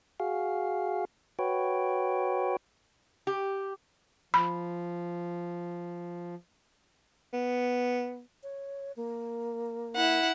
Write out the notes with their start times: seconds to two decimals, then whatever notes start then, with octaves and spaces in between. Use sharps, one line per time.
0.20 F#4 G#4 F5
1.39 F#4 B4 C#5 G5
3.27 G4
4.34 F3 B5
7.33 B3
8.43 C#5
8.96 A#3
9.95 E4 F#5